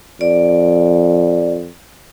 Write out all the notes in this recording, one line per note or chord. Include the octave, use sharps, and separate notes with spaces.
F2 D5